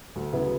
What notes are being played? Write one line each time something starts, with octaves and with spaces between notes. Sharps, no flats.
D2
C#3 F#3 B3 E4